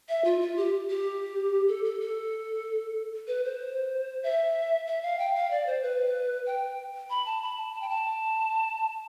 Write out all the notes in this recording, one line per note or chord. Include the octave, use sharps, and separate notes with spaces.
E5
F4
F4
G4
G4
A4
A4
A4
B4
C5
E5
E5
F5
G5
F5
D5
C5
B4
G5
B5
A5
B5
A5
A5
G5
A5